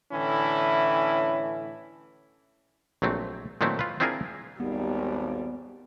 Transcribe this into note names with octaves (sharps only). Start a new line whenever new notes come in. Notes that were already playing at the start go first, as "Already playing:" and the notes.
A2 D3 E3 C#4 E4
A#1 F#3 A3 C4
A#2 D#3 F#3 A3 C4 E4
F4 B4
C4 D4 E4 F4 G#4 A#4
G#1 D#2 G3 B3